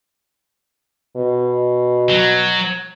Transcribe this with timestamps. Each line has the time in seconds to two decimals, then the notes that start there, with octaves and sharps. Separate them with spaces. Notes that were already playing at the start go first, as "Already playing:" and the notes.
1.17 B2
2.10 F#3